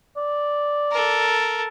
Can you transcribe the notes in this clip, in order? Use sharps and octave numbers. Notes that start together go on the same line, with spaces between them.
D5
A4 A#4